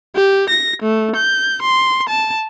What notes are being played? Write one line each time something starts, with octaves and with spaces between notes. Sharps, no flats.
G4
A#6
A3
G6
C6
A5